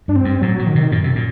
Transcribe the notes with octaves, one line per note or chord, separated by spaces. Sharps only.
G2 D4
C4
G2
A2 F#3
A#2
D#3
C3
F#2 A#2
C3
A#2